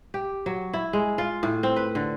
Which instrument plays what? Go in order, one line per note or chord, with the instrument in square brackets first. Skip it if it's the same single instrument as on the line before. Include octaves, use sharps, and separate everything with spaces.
[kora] G4
F#3
E4
G#3
F4
A2
C4
B4
D3